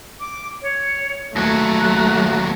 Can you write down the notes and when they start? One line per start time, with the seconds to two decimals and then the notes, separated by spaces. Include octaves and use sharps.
0.20 D6
0.62 C#5
1.36 D#2 F#3 A3 F#6